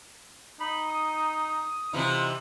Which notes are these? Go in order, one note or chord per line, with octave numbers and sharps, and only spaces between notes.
D#4 B5
D#6
C3 E3 D#4 F4